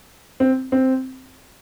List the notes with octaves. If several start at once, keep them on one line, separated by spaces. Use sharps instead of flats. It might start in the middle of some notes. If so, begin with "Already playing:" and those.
C4
C4